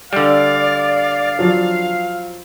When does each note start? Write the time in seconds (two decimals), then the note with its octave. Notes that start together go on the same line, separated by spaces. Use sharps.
0.13 D3 G3 D5 F5
1.39 F3 F#3